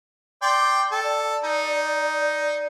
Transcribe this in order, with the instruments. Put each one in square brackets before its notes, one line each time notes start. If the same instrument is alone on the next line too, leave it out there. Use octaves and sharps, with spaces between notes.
[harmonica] D5 G5 C6
[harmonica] A4 [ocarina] G5
[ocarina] D5
[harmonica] D#4